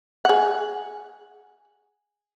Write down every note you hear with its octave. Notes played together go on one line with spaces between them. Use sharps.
G#4 F#5